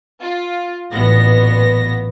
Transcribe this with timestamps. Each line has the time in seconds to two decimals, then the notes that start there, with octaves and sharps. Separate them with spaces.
0.19 F4
0.92 A1 A#2 F#3 B3 A#6